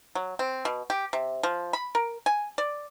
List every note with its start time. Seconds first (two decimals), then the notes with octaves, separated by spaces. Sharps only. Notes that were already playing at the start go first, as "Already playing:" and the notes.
0.15 F#3
0.39 C4
0.65 B2
0.90 G4
1.13 C3
1.43 F3
1.73 B5
1.95 A#4
2.26 G#5
2.58 D5